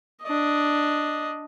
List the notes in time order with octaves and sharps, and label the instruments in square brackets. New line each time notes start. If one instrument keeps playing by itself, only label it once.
[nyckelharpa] D4 D#5